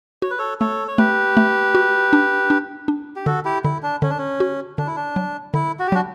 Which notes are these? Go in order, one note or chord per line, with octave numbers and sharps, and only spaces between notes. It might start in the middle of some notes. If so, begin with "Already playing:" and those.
F#4 C#5
B4
A4 C#5
A3 A4 C#5
C#5
A3 G4 B4
A3
F#4
D4
D4
D4
G4
D3 F#4 A4
E4 G4
D3 E4
D4
D3 C#4
D4
C#4
F#4
D3 D4
E4
D4
F#3
D3 E4
F#4
G4
F#3 D4 F#4